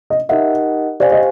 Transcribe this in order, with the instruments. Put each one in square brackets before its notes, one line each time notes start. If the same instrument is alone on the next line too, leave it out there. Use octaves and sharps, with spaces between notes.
[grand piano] D#5
[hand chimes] D#4 G4 A#4 D#5 F#5 [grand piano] E5
[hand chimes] G4 C5 F5 G#5 [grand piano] D5
[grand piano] D#5